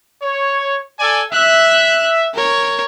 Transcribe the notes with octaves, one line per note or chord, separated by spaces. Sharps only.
C#5
A4 D5 G#5
E5 F#6
A#4 C#5